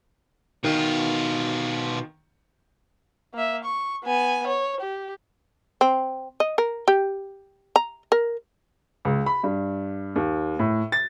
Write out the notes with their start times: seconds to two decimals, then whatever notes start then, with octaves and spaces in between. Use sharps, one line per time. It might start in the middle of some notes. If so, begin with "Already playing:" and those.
0.64 B2 D#3 F4
3.34 A#3 E5
3.64 C#6
4.04 B3 G#5
4.47 C#5
4.80 G4
5.81 C4
6.40 D#5
6.58 A#4
6.88 G4
7.76 A#5
8.12 A#4
9.05 C#2
9.26 B5
9.44 G2
10.16 D#2
10.59 A2
10.92 A6